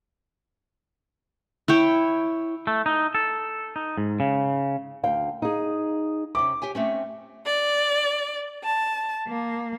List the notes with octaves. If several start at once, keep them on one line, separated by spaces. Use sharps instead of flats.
E4 C#5 G5
A3
D#4
A4
D#4
G#2
C#3
D2 F5 G5
D#4 G#4
C3 C#4 D6
G4 C#5 G#5
A3 C4 C#4
D5
A5
A#3